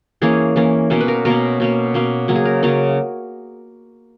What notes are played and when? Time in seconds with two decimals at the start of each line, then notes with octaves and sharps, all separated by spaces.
0.22 E3 A#3 C#4 G#4
0.56 E3 A#3 C#4
0.90 B2 A#3 C#4
1.00 B4
1.08 A#4
1.25 B2 A#3 C#4 A#4
1.60 B2 A#3 C#4
1.94 B2 A#3 C#4
2.28 C#3 F#3 A#3
2.35 G#4
2.45 A#4
2.63 C#3 F#3 A#3 C#4